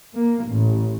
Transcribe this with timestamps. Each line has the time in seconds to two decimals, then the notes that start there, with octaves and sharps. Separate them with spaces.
0.12 A#3
0.45 A1